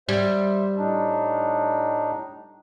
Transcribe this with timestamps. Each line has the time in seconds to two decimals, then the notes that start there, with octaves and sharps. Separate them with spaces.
0.09 G3 C5 E5
0.77 A2 D4 D#4